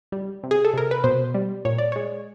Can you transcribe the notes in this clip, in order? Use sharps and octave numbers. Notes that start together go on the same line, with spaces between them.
G3
C3
G#4
A4
C3 A#4
B4
B2 C5
G3
A#2 C#5
D5
G#3 C#5